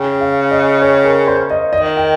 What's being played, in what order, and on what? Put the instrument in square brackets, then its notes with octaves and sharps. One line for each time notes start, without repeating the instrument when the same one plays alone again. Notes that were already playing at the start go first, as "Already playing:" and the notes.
Already playing: [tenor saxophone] C#3 [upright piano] G5
[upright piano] F5
D#5
C#5
A#4
C5
D#5
[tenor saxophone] D#3 [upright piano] D#5
[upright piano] G5